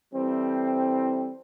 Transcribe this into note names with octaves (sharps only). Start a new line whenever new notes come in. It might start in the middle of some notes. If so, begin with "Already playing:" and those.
E3 G3 C4 E4 A4